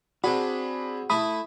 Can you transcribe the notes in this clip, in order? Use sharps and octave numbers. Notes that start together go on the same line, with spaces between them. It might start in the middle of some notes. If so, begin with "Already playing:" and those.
C4 D4 F#4 G#4 B5
A3 E4 A4 B5 D#6